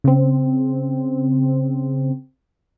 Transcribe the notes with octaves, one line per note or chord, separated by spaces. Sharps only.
C#3 C4